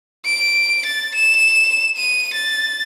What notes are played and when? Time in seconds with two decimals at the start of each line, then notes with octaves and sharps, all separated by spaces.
0.26 D7
0.86 A6
1.15 E7
1.97 D#7
2.34 A6